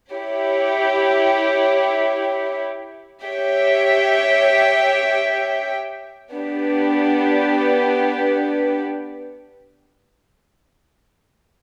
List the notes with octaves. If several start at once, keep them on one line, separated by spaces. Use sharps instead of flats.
E4 G4 C#5
G4 C#5 E5 G5
B3 D4 G4 B4